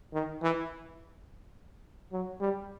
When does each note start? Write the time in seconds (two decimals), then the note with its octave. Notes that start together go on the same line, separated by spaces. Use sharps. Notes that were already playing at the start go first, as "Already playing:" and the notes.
0.13 D#3
0.43 E3
2.12 F#3
2.41 G3